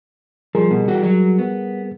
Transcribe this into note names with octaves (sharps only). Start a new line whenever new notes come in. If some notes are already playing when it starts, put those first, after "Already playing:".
F3 G3 G#4 A#4
B2
E3 F#4 G4
F#3
B3